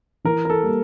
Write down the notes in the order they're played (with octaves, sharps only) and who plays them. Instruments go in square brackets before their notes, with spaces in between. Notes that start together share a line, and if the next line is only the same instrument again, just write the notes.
[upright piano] E3 [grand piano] A#4
[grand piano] A#4
A4
[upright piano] G3 A#3